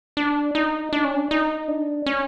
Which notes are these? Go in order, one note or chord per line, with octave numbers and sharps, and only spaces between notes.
D4
D#4
D4
C#4
D4
D#4
D4
C#4